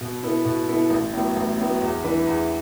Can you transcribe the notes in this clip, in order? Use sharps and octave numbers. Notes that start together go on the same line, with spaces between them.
B2
B3 E4 A4
B2
B3 E4 A4
A1
A2 F#3 B3
A1
A2 F#3 B3
E2
E3 D4 B4
E2